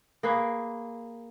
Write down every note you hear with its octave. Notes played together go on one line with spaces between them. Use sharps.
A#3 G#4 B4